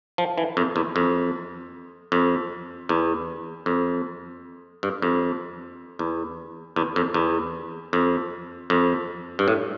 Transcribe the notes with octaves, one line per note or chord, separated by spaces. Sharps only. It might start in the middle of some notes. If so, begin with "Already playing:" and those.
F3
E3
F2
E2
F2
F2
E2
F2
G2
F2
E2
E2
F2
E2
F2
F2
G2
A2